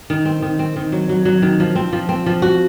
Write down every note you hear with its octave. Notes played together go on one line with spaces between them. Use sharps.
D#3
C4
D#3
C4
D#3
F#3
F#3
F#3
D#3
F3
C4
F3
C4
F3
F#4